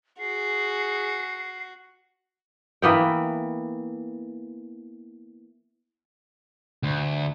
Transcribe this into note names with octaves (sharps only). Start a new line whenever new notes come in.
F#4 G#4 C7
E3 A#3 B3 G5
D2